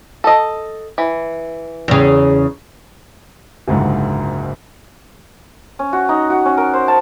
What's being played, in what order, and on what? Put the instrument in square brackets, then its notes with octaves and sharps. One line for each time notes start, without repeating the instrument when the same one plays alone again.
[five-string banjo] A4 D#5
E3
[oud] E2 C#3
[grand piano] F#1 C#2 G#2 D3
[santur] C#4
F#4
D#4
F#4
C#4
A#4
C5
A5